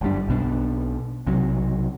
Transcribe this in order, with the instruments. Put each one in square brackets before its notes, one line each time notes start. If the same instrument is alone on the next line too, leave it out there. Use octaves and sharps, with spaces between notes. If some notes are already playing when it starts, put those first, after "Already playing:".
[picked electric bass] G1 F#2 G3 D4
B1 B2 D4
B1 C3 F#3